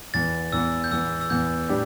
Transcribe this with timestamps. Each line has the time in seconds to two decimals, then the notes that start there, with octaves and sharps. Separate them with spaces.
0.14 E2 E3 B3 A6
0.52 E2 E3 B3 E6
0.84 G6
0.91 E2 E3 B3 E6
1.21 E6
1.30 E2 E3 B3 G6
1.69 A2 G3 D4 G4 B4